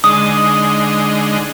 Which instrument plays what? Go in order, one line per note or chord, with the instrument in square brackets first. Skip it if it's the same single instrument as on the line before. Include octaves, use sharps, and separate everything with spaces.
[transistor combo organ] D3 G#3 D#4 [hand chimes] D#6